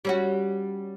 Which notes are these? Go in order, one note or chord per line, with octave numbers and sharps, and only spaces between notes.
G3 C#4 F#4